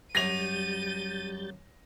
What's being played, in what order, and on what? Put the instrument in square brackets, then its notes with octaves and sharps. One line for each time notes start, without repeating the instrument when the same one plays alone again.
[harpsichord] F#2 G#5 [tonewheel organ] G3 G6 A6 [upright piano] A#6 F7 [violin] D#7